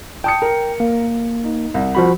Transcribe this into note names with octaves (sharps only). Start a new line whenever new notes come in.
G5 A5 D#6 C#7
A#4
A#3
D#4
C2
F3 F#4 B5